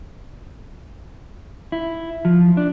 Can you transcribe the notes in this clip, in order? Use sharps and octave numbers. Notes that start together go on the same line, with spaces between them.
E4
F3
D4